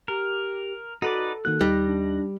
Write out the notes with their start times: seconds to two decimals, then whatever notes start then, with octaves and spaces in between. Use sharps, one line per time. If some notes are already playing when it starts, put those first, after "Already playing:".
0.08 G4 A#4
1.02 D#4 F#4 A4 B4 D5
1.45 D#3 A#3 F#4 F#6
1.61 D#2 G3 D#4 A#6
1.86 D4